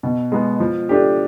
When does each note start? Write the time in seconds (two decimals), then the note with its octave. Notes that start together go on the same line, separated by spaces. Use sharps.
0.03 B2
0.32 G#3 B3
0.60 F3
0.89 A3 D4 G4